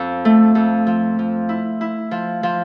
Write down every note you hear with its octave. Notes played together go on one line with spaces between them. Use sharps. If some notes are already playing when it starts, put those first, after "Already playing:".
Already playing: F2
A3
F2
F3
F3
E4
E4
F3
F3